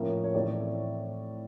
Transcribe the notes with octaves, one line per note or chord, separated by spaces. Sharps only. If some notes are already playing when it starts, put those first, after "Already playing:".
Already playing: A2 F3 A#3 C#4
C#5
A2 E3 A3 C4 D5